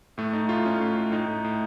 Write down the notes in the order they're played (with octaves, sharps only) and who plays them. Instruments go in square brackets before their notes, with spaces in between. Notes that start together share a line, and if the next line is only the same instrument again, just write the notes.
[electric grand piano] A2 A3
A2 D#4
A2 F4
A2 C#4
A2
A2
A2 D#4
A2
A2